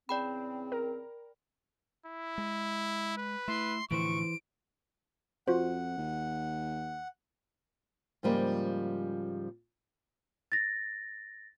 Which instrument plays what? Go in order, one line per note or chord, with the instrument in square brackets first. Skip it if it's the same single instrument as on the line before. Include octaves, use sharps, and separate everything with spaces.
[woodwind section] E2 C#3 C4 [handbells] D5 G5 B5
[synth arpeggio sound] A#4
[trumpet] E4
[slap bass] G#3
[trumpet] B4
[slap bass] A3 [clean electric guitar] E4 [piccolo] C6
[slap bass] A2 D3 F3 [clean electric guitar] E3 C5 [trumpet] C#6 [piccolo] D7
[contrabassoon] F2 [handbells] F4 F#4 C5 [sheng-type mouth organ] F#5
[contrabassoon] D#2
[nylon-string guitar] G#2 C#3 F3 G3 A#3
[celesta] A6 A#6